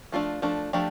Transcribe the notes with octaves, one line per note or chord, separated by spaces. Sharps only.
F3 A3 D4 F4
F3 A3 D4
F3 A3 D4 G4